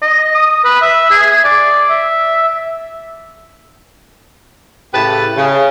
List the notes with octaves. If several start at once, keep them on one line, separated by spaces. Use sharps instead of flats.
D#5
D#6
B4
E5
G#4
D5
E5
A2 C#3 A3 G4 B4 A5
C#3